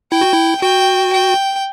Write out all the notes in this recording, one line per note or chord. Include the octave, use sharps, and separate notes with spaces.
E4 G5
F#4
E4
F#4 G5
G5